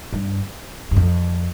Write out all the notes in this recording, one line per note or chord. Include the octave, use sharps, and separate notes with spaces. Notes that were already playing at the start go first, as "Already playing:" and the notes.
G2
G2
F2